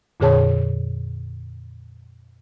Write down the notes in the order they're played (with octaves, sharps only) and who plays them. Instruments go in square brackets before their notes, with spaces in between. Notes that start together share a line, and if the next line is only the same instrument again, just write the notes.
[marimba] F2 A#2 D3 G#4 C#5 A5